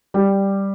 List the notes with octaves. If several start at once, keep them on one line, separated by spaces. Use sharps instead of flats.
G3